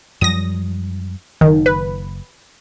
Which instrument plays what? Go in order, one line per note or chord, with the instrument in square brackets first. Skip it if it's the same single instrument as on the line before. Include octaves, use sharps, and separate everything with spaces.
[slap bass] F#2 F3 G3 [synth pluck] D#6 A#6
[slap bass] F#1 [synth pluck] D#3
[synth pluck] B4